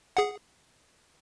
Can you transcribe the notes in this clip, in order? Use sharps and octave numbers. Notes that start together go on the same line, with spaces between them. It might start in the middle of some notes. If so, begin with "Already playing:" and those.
G#4 F#5